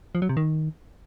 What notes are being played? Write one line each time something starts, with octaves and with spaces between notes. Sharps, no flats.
F3
F#3
C3
D#3